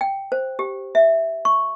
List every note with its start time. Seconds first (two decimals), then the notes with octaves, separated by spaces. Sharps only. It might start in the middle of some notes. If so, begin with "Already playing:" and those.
0.01 G5
0.32 C5
0.59 G4
0.95 E5
1.45 C#6